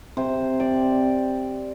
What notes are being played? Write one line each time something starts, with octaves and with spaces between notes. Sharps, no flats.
C3 C5
C4 D5